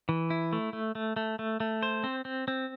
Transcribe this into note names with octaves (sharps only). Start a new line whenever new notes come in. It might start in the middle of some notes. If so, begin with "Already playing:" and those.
E3
E4
A3
A3
A3
A3
A3
A3
C5
C4
C4
C4